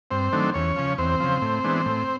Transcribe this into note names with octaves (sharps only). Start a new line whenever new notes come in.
G2 C4 C5
D#3 F#3 A3 D4
E2 C#4 C#5
C#3 F3
E2 C4 C5
C#3 F3
A2
E3 G#3 B3 D4
A2